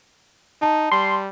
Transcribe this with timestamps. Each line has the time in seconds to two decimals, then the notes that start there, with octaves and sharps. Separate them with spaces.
0.62 D#4 A5
0.92 G3 C6